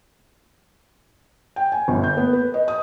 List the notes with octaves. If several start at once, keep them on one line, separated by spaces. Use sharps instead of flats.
G5
G#5
G1
G6
B3
B4
D#5
D#6